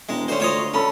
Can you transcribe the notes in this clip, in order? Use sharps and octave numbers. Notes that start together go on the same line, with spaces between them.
E1 G#3
D2 C#4 C5
F4 C#5 D#5
C#4 A4 A5 B5